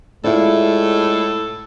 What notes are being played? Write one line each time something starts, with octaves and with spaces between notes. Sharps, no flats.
A2 G#3 E4 F4 A4 D5